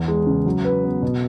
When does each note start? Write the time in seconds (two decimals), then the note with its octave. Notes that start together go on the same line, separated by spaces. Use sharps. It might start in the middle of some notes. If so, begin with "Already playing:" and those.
Already playing: E2
0.08 G#3
0.27 C#3
0.46 F#3
0.65 B4
0.84 B3
1.03 B2